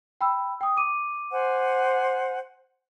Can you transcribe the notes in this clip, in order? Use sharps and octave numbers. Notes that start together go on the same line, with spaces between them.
G5 B5 E6
G5 D#6
D6 D#7
C5 F#5 G#5